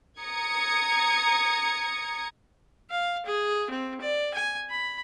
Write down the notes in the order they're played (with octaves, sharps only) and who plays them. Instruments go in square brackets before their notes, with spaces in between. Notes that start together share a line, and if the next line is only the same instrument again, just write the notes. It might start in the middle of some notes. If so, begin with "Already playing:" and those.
[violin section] A#5 D#6 G#6 C#7
[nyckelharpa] F5
G#4
C4
D5
G#5
B5